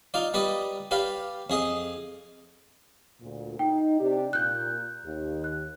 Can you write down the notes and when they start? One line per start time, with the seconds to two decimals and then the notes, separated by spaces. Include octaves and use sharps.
0.14 D#4 F4 D5
0.34 G3 B4 D5 D#5
0.91 G4 B4 D5 F5
1.50 F2 G#4 D#5
3.21 D2 A#2
3.59 D#4 G5
4.00 C3 D4 G4
4.33 A#2 F#6 G6
5.05 D#2
5.44 F#6